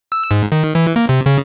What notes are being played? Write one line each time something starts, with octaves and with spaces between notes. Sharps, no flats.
E6
G#2
D#3
E3
A#3
C3
C#3